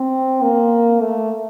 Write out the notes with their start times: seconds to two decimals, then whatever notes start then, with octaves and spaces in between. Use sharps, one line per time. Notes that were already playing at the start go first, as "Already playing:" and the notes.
Already playing: C4
0.42 A#3
1.00 A3